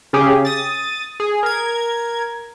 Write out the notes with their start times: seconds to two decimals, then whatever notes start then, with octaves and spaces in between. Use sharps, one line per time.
0.13 C#3 C#4 G4 G#4
0.45 D#6 A6
1.20 G#4
1.43 A#4 G#6